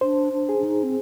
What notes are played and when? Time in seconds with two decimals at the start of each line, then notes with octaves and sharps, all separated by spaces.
0.01 D4 C5
0.33 D4
0.49 G#4
0.59 D4
0.64 D#4
0.83 C4